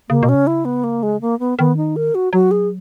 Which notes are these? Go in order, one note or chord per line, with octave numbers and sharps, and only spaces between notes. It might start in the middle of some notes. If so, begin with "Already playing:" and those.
C#3 A#3
B2
C#4
C#3
E4
B3
A#3
G#3
A#3
B3
D#3 B3
D#4
A#4
F#4
F#3 F#4
G#4